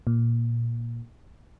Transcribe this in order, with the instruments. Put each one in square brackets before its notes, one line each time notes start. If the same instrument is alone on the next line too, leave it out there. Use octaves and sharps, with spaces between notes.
[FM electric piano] A#2